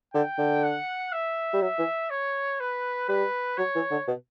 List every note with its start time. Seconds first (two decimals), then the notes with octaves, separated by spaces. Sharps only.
0.14 D3 G5
0.39 D3
0.63 F#5
1.13 E5
1.53 G3
1.62 F#3 E5
1.79 E3
2.10 C#5
2.60 B4
3.09 G3 B4
3.58 F#3 C#5
3.75 E3
3.91 D3
4.08 B2